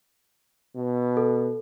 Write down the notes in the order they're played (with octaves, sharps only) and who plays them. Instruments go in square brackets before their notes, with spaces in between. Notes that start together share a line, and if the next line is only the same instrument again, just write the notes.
[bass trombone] B2
[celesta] A4